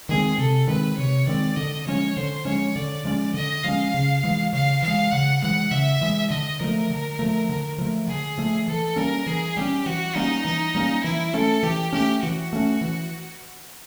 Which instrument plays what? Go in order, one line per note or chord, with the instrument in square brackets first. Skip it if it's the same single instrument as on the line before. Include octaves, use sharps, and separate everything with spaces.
[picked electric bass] D#3 G#3 C4 [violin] G#4
[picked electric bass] C3 [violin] A4
[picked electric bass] D#3 G#3 C4 [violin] B4
[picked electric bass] C3 [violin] C#5
[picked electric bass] D#3 G#3 C4 [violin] D5
[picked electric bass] D3 [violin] D#5
[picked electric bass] F3 G#3 C#4 [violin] C#5
[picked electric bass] D3 [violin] C5
[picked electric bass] F3 G#3 C#4 [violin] C#5
[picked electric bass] D3 [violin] D5
[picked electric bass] F3 G#3 C#4
[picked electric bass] D3 [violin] D#5
[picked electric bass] F3 G#3 C#4 [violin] F5
[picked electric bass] C#3
E3 G#3
[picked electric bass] C#3 [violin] F5
[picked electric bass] E3 [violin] F5
[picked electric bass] G#3
[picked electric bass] C#3 [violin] F#5
[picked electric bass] E3 G#3 [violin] F#5
[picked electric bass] C#3 [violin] E5
[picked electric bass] E3 G#3
[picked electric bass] D3 [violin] D#5
[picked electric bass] F3 A3 [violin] A#4
[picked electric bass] D3
F3 A3
D3
F3 A3
[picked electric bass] D3 [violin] G#4
[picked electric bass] F3 A3
[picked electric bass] E3 [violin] A4
[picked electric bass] G3 A#3 C#4 [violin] A#4
[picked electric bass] E3 [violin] G#4
[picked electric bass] G3 A#3 C#4 [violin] G4
[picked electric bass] E3 [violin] F#4
[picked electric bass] G3 A#3 C#4 [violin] D#4
[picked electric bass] E3 [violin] D#4
[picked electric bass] G3 A#3 C#4
[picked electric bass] E3 [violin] E4
[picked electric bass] A3 C#4 [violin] A4
[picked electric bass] E3 [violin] G4
[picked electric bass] A3 C#4 [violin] G4
[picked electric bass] E3 [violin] F#4
[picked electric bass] A3 C#4
E3